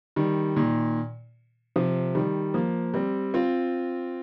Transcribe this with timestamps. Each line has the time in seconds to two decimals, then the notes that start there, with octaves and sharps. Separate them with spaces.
0.16 D#3 G3
0.56 A#2 D#3
1.76 C3 F3
2.15 D#3 G3
2.54 F3 A#3
2.94 G3 C4
3.34 C4 F4